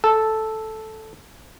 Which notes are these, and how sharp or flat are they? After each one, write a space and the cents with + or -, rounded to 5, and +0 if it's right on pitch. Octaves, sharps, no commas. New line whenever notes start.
A4 -5